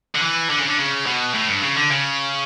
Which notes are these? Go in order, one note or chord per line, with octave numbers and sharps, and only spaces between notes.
D3
E3
D3
C#3
D3
C#3
B2
A2
G2
C#3
D3
C#3